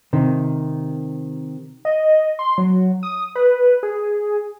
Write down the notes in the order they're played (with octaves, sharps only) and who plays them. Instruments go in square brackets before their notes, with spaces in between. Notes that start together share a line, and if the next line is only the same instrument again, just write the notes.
[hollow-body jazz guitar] C3 D#3
[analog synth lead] D#5
C6
F#3
D#6
B4
G#4